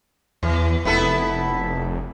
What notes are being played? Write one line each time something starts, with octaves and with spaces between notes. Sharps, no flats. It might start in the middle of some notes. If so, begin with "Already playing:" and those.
E2 E3
F1 B3 E4 A4